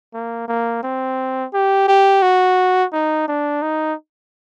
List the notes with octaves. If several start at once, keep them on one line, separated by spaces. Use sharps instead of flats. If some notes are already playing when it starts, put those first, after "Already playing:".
A#3
A#3
C4
G4
G4
F#4
D#4
D4
D#4